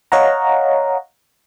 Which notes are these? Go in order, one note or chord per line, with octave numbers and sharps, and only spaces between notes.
C#5 D#5 F5 F#5 A#5